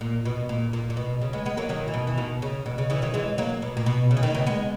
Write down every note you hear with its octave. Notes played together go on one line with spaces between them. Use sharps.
A#2
B2
A#2
A#2
A#2
B2
C#3
G#3 B3
G#3 B3
F#3 A#3
D#3 F#3
E3
B2 D#3
E3
B2 D#3
C#3
B2
C#3
C#3 E3
D#3 F#3
E3 G#3
F#3 A#3
B2
A#2
B2
C#3
E3
B2 D#3
C#3 E3
G#3 B3